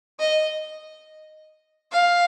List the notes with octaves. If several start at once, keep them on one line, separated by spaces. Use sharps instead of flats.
D#5
F5